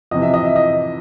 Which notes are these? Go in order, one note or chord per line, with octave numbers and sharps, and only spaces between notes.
F2 C3 E3 D#5
E5
D#5
E5
D#5